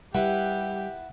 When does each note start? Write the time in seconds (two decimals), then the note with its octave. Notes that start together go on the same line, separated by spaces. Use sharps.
0.15 G3 E4 G4 B4 F#5